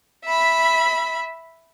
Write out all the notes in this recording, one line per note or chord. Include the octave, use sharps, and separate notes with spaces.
E5 B5